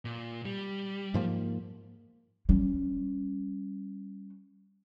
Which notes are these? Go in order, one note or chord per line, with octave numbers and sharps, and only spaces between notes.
A#2
G3
G#2 F3 A#3
G3 C#4